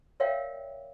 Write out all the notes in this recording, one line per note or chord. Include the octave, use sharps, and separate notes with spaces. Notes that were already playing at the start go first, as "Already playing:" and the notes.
A#4 C#5 D5 E5 F5 G5